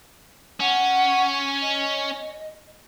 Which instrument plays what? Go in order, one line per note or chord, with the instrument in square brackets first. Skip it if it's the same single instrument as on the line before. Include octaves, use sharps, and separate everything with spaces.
[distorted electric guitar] C#4 [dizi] F#5
[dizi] D#5